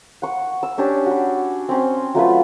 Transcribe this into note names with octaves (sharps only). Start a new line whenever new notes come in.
F#5 C#6
E6
C#4 D4 G4 C#5
F#4 B5
C4 C#4 C6
F#3 A3 F4 B4